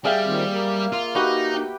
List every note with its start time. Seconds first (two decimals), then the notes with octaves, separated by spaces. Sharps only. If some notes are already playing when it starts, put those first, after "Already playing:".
0.05 G3 G#4 E5 F5 G5
0.25 A#2 D#3 C4
0.49 A#3
0.92 F4
1.15 D#4 F#4 G4 B4
1.54 G5